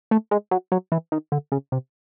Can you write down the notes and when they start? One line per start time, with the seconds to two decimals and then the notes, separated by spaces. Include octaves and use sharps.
0.11 A3
0.31 G#3
0.51 F#3
0.72 F#3
0.92 E3
1.12 D#3
1.32 D3
1.52 C#3
1.72 C3